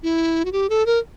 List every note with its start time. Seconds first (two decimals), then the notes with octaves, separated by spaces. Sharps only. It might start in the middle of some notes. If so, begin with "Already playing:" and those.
0.03 E4
0.45 F#4
0.52 G4
0.70 A4
0.86 A#4